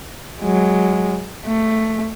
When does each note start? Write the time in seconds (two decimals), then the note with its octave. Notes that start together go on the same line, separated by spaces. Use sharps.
0.40 F#3 G#3
1.46 A3